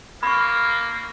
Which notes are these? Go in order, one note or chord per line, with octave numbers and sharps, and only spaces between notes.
A#3 B5 C#6